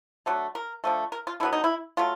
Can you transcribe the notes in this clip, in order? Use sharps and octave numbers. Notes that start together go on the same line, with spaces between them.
D3 F#3 A3
A#4
D3 F3 A3
A#4
F4
D3 F#3 B3 E4
D#4
E4
F#3 A3 F4